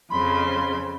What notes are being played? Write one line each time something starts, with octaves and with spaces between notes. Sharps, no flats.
F2 C#3 B5 C6